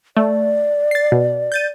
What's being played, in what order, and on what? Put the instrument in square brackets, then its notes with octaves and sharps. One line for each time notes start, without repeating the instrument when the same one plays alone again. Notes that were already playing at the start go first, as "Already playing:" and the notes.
[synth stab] A3 [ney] D5
[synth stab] A6 C7
B2
G6 A6 D#7